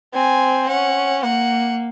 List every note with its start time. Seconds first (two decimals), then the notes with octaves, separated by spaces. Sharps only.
0.14 C4 G#5
0.68 C#4 F#5
1.23 A#3 F#5